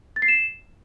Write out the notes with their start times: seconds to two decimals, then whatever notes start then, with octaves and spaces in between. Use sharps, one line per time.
0.16 A6
0.22 C7
0.28 E7